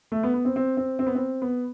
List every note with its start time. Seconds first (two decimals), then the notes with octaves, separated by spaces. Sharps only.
0.12 A3
0.23 B3
0.34 B3
0.45 C4
0.56 C4
0.77 C4
0.99 C4
1.07 B3
1.15 C4
1.42 B3